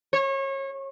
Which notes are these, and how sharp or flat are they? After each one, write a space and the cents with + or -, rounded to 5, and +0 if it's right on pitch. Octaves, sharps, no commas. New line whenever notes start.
C#5 -30